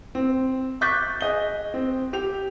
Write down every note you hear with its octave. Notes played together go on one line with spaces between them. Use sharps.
C4
C#6 D6 F#6 G6 A6 B6
G#4 D#5 G7
C4
G4 F7